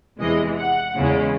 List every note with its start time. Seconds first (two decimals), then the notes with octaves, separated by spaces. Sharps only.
0.20 E2 C3 E3 G#3 D#5
0.59 F#5
0.96 E2 C#3 G#3 C#4